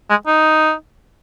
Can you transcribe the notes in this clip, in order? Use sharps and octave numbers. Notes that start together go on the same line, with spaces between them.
G#3
D#4